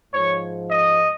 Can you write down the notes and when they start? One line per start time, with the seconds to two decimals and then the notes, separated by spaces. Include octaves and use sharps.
0.13 G#2 F3 C#5
0.70 D#5